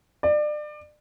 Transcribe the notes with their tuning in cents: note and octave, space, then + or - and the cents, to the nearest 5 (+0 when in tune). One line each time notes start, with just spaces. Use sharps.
D5 +30